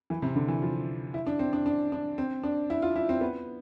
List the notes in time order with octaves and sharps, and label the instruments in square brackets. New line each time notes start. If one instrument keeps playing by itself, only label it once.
[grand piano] E3
C3
D3
E3
F3
E4
D4
C4
D4
D4
D4
C4
D4
E4
F4
E4
C4
B3